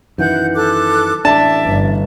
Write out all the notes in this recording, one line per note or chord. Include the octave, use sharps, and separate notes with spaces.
F#2 D#3 E3 F#5 G6
A4 D6 F#6
A1 D4 D5 E5 A5
G1